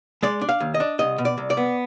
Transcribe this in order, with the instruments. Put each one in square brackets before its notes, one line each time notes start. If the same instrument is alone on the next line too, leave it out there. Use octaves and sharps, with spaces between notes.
[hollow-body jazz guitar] G#3 D5
D4
F5
D#2
D#5
D4
C2 D#5
B2
D5
C2
D5
B3